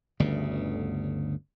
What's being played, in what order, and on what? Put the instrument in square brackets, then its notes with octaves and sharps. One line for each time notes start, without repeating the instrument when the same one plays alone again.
[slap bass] G1 D2 C#3